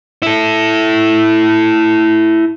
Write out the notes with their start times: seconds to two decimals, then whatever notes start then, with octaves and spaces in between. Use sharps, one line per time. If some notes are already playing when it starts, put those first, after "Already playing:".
0.23 E4 A4